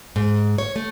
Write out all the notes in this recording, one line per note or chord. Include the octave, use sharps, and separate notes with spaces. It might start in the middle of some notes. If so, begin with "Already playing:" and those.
G#2
C#5
A3